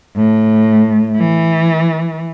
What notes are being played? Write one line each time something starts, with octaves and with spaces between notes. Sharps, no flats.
A2
E3